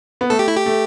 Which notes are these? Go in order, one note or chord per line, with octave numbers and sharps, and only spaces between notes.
B3
A3 A4
G4
E4
G4
A3